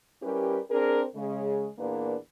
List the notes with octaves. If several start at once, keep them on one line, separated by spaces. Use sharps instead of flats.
G3 C#4 E4 G4 A#4 B4
C4 D4 G#4 A#4
C#3 G#3
E2 A#2 A#3 D4 A#4 B4